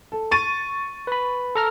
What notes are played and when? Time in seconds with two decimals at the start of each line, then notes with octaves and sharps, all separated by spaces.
0.12 A4
0.31 C#6 A6 D#7
1.07 B4 B5
1.55 A4 A#5 F6